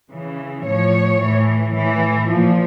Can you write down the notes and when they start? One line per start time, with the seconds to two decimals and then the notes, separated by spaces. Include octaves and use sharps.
0.10 C#3 E3
0.64 A2 F3 C#5
1.20 A2 E3
1.74 A2 E3
2.29 A#2 F3